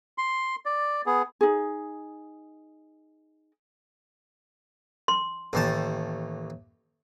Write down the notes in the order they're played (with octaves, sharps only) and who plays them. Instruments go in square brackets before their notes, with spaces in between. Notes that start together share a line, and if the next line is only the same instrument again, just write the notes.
[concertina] C6
D5
B3 G#4
[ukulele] D#4 G#4
[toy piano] C6
[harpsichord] A1 D#2 A5